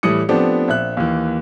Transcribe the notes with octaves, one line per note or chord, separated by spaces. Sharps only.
A2 E3 G3 E4 D#6 C#7
F3 A3 B3 C4 D4 G4
A#1 E5 F#6
D#2 E3